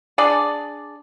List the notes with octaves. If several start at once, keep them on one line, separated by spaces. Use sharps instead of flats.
D4 G#4 D5